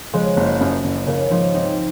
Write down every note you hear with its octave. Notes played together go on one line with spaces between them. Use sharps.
C#3 F3 G#3
F#1
F#2
F#1
C#3 A#3
G#2 C#3 F3
G#2 C4 D#4